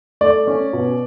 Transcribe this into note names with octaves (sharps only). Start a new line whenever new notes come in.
A3 D5
C#4
B2